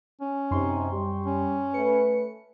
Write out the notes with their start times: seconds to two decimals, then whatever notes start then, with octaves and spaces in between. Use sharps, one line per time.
0.21 C#4
0.51 F#2 C3 D#4 C6 C#6
0.92 G3 G4
1.26 C#4
1.74 A3 B4 C#7